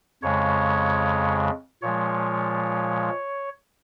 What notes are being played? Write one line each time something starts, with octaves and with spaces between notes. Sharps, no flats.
F2 C#3 G#3 C#5
A#2 F3 G#3 C#5